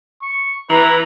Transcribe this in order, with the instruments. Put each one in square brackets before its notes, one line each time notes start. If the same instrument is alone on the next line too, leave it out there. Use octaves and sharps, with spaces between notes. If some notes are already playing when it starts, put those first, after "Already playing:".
[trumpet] C#6
[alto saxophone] E3 [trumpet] B4 [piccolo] A#5